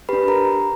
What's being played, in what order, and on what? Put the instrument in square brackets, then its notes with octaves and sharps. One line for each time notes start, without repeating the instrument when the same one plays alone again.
[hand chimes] D4 G4 B4 B5
A#4 A#5